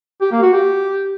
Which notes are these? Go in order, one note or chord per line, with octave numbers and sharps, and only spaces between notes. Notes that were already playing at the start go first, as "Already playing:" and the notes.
G4
A#3
F#4
G4